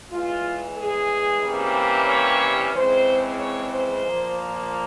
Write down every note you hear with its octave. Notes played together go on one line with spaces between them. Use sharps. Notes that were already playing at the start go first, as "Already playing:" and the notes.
E2 E3 G#3 F4
G#4
C3 E3 G3 A#3 C#4
C#5
C#3 E3 G#3 C4 C5
C#5
C5
A#2 F3 A#3